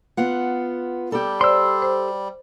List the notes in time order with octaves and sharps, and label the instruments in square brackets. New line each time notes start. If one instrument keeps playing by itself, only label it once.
[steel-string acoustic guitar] B3 F4 F#5
[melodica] G3 [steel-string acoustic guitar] G4 A4
[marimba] C5 D5 [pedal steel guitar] C6 E6
[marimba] C5